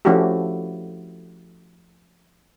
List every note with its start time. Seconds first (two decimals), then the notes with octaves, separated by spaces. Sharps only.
0.05 F3 A3 C#4 E4 F#4 G4